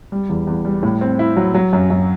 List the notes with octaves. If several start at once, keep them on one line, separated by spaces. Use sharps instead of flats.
G3
E2
E2
G3
A2
C4
E4
F#3
F#3
F#2
F#2